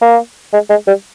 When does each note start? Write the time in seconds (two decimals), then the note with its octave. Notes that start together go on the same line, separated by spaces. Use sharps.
0.02 A#3
0.53 G#3
0.70 G#3
0.87 G3